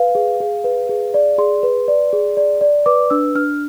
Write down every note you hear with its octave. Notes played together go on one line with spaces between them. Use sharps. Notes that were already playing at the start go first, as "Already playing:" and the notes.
Already playing: B4 F5
G#4
G#4
B4
G#4
D5
G#4 C6
B4
D5
G#4
D5
D5
B4 D6
D4 E6
D4 F6